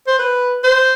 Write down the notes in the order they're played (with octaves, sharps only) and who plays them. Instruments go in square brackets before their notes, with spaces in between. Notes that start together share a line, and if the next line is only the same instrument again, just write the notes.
[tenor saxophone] C5
B4
C5